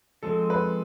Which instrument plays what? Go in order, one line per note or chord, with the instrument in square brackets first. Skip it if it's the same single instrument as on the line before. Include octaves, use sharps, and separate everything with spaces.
[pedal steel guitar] F3 G#3 C4 [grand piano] A4
[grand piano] B4